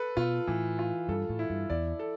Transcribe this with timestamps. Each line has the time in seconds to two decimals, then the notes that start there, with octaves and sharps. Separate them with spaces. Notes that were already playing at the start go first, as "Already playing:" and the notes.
Already playing: A4 B4
0.17 B2 F4
0.47 A2 E3
0.79 F4
1.09 G2 A4
1.30 A2
1.39 E4
1.50 G2
1.70 E2 D5
1.99 A4